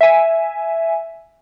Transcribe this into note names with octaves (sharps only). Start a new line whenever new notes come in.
E5 G#5